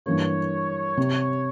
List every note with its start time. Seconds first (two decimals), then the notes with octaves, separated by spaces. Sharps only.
0.06 G2 E3 A#3 C#5
0.97 C3